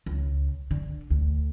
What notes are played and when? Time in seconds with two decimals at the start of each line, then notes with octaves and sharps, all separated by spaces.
0.06 C#2
0.71 D3
1.10 D2